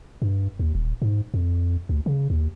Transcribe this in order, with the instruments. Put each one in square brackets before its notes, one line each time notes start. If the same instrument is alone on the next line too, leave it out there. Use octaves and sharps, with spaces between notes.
[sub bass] G2
D#2
D#1
G#2
F2
D2
C#3
D#2